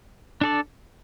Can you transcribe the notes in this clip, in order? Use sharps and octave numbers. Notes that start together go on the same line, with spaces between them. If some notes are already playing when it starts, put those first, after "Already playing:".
D4 A4 D5